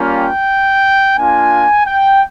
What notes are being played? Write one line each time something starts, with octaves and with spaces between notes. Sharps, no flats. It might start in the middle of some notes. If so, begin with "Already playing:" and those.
Already playing: G3 A#3 C#4 F4
G5
A#3 D4 F4 G#5
G5